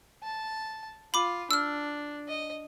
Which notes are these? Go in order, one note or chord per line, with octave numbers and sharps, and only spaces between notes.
A5
F4 B5 D6
D4 E6 F6
D#5